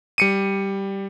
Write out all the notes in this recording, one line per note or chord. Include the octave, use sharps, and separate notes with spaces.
G3 C#7 D#7